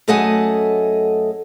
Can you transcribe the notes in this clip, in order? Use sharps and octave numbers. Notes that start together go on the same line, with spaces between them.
F#2 A3 A4 D#5 F#5 G#5